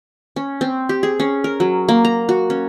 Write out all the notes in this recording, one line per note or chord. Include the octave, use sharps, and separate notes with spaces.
C#4
C4
G4
G#4
C#4
A#4
F#3
A#3
A#5
F#4
C#4